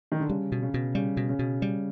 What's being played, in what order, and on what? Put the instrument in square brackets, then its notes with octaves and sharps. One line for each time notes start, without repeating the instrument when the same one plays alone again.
[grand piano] D#3
D3
[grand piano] C#3 [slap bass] G3
[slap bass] B2
[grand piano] C#3
[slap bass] B2
[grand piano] C#3 [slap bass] G3
[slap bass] B2
[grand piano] C#3
[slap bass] B2
G3